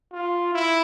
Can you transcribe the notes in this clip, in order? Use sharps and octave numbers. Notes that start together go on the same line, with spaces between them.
F4
E4